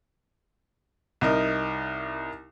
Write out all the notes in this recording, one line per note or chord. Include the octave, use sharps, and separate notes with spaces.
C2 D#4 A#4